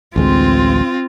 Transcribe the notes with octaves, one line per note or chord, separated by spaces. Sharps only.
A1 D2 G#3 C4 F4